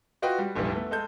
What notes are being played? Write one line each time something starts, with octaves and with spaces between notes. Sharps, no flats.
F4 F#4 B4 D#5 G5
G3
F1 A#1 E3 G3
A3 B3
G#3 A4 G6